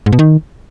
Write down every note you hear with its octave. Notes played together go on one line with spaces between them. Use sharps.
G#2
B2
D#3